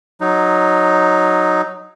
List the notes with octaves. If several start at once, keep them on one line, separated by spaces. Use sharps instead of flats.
F#3 D#4